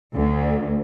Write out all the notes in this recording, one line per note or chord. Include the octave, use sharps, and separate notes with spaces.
D2